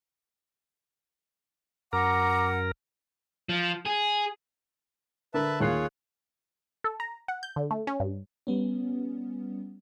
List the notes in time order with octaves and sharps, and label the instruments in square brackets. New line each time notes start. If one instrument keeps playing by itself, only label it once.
[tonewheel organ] F#2 A#4 [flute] F#5 [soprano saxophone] A#5 [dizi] D6
[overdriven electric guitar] F3
G#4
[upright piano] D3 A#4 [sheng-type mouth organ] B4 E5 A5
[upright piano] D#2 F#6 C7 [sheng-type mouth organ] F4 G#4 C#5
[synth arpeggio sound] A4
A#5
F#5
G6
D3
A3
C#4
G2
[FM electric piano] G3 B3 C#4